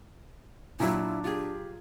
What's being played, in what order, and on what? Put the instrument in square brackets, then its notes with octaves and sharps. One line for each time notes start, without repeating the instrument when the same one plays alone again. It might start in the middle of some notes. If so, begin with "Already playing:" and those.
[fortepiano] A#2 F#3 [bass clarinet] D4 [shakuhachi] E4 [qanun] F4
[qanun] F4 G#4 [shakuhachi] G4